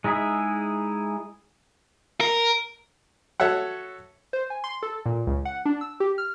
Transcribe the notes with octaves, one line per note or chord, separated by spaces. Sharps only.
G#3 D#4 E4 G#4 E5
A#4
F#4 A4 C#5 E5 F#5
C5
G#5
C6
A4
A#2
C#2
F#5
D4
E6
G4
F6